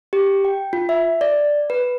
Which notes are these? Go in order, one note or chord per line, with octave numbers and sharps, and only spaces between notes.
G4
G5
F4
E5
D5
B4